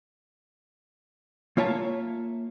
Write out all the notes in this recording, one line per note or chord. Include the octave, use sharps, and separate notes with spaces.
A#3 F4 C#5 E5 G#5 A5